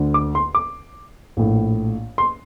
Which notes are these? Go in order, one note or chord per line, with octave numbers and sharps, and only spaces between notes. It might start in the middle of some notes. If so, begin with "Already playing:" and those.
Already playing: D2 D3
D6
C6
D6
A#1 A2
C6